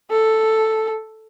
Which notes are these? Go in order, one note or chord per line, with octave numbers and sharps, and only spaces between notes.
A4